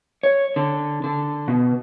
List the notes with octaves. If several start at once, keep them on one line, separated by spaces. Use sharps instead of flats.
C#5
D3
D3
B2